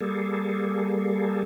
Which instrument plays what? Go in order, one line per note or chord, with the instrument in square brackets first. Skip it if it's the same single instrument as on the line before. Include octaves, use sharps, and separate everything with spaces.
[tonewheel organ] G3 A#3 G#4 A4